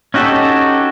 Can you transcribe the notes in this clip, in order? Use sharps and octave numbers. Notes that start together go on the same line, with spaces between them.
C#4 D#4 F#4 G4 A4